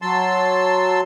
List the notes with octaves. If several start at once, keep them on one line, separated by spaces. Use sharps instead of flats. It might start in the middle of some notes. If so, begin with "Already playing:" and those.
F#3 A5 C6 E6